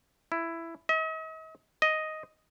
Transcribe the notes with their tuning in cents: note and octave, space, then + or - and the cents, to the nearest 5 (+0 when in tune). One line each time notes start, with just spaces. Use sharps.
E4 +10
D#5 +45
D#5 +5